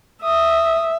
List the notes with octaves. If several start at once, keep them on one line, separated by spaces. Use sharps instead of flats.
E5 D#6